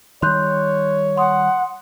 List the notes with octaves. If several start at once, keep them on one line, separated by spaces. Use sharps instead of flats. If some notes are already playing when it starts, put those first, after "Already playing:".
D#3 G3 C#5 C6 F#6 G6
F#5 C6 D#6